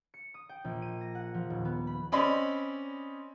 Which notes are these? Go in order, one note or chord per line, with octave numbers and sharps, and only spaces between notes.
C#7
D#6
G5
A#1
D#7
A#6
F#5
F3
D#1
B3
B5
C4 C#4 D5 D#5 B5 C6